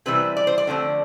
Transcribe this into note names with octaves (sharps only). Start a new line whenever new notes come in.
C3 E3 G3 C4 B4
D5
C5
D5
D3 F3 A3 C4